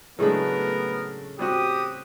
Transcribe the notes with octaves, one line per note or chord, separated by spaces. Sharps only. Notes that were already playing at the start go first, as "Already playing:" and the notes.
A2 C#3 F#3 G#3 A3 B3 D4 A#4
G3 C4 F#4 G4 D#6